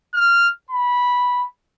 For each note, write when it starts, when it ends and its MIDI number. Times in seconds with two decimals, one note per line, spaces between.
0.14 0.49 89
0.71 1.45 83